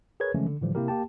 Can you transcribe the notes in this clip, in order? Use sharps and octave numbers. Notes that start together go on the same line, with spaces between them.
G#4 A#4 B4 C#5 G#6
C#3 E3 F3 G#3 A3 C#4
D3
A2 D3 E3 F3 G3
C3 A#3 E4 G4 A#4
A#3 G4 G5 A5